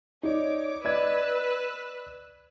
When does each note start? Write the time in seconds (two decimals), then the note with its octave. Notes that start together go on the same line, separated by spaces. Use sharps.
0.23 D#4 C#5 D5 D6
0.85 B4 D5 D#5 E6 F#6 G#6